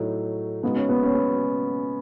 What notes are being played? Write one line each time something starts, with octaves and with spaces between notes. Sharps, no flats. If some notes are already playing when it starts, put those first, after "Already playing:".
Already playing: A2 F#3 A3 D#4
C#3 G#3 B3 D#4 F#4
C#4
B3
C#4
B3